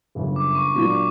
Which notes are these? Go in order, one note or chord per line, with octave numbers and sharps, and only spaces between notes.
G1 F#2 C#3
D6
C#6
A#2 F#3 A#3 D4 F4 C#6
D6